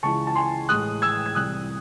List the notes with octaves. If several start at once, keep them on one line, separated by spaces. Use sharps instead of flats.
C#2 C#3 E3 G#3 A5 C#6
A5
G#5 C6
A1 A2 G#3 D#6 F#6
E6 G#6
G#6
C2 C3 E3 D#6 F#6